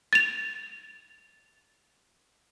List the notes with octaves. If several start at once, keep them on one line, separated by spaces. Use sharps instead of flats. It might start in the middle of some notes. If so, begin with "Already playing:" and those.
A6 F7